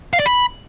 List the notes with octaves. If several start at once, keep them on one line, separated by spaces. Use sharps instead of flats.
F5
D5
B5